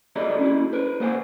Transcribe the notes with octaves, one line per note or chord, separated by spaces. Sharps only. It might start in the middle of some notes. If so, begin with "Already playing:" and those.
E4 G4 A4 A#4 D5 D#5
C#4 E4 F#4
A#4 B4
A#3 C5 F#5 G#5